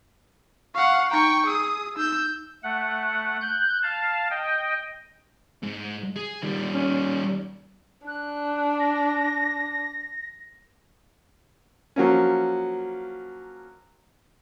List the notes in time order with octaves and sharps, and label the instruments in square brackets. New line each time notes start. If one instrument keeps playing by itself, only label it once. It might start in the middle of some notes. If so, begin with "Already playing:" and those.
[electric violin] F5 F#5 [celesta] C#6
[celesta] D#4 A#5 [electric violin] G5 C#6
[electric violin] G#4 D#6 [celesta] E6
[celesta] D#4 [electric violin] E6 G6
[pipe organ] A3 F#5
F#6 G6
F5 A5
D#5 G5
[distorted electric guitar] G#2
G#4
D#3 G3
[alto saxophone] C#4
[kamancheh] D4 [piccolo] F#6
[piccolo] A#6
[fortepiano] F3 F#3 A#3 C#4